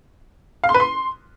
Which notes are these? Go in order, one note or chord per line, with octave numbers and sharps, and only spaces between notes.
F5
C6
B4
C6